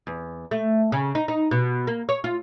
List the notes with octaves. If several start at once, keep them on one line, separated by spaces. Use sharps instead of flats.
E2
A3
C#3
D#4
D#4
B2
A#3
C#5
F4